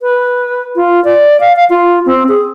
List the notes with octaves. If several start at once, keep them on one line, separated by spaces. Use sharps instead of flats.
B4
F4
D5
F5
F5
F4
C4
G#4